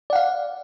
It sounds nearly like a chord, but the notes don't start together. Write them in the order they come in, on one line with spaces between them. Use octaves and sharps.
D5 F#5 F5